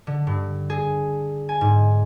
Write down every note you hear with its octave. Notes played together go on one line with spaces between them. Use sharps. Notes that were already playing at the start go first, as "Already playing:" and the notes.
D3
G2
G#4
G#5
G#2